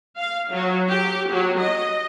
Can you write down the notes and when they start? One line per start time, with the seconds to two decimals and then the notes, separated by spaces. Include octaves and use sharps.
0.18 F5
0.52 F#3
0.90 G4
1.31 F#3
1.61 D#5